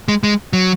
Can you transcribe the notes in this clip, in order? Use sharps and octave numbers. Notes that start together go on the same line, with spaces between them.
G#3
G#3
F#3